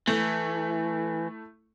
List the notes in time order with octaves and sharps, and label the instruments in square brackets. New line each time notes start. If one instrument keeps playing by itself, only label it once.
[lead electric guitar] E3 [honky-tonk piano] A3 E4